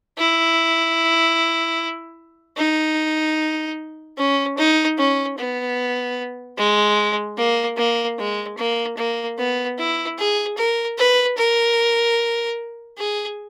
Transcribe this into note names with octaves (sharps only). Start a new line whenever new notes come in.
E4
D#4
C#4
D#4
C#4
B3
G#3
A#3
A#3
G#3
A#3
A#3
B3
E4
G#4
A#4
B4
A#4
G#4